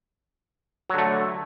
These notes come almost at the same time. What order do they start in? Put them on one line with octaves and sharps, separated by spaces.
F#3 D3 A3